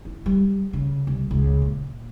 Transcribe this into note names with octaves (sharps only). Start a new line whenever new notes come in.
E4
G3
C#3
C2
C#2
A#2